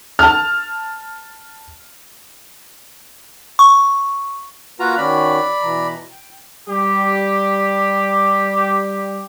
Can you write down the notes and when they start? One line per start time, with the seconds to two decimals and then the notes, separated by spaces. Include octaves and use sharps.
0.19 A5 F6
3.59 C#6
4.80 A#3 F4 F#4 B4 A#5
4.98 D#3 C#4 F#4 D5 B5
5.62 B2 E3 A#5
6.12 G5
6.69 G3 G4